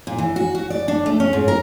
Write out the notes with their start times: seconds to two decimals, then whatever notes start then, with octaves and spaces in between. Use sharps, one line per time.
0.07 A#2
0.18 E3
0.36 F#4
0.55 F#4
0.70 D5
0.88 D4
1.06 A3
1.20 C#4
1.33 G#2
1.48 A#4